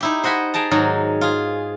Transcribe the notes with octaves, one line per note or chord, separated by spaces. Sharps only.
D#4 E4 G4
C5 D#5 F#5 G#5 B5
G#4 G5 A5 A#5
G#2 D#3 F#3 D#4
F4 G#4